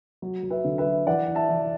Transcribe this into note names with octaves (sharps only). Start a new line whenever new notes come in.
F#3
F#3
B4 E5
D3
B4 E5
F#3
E3 D5 F#5
E3
E5 A5
E3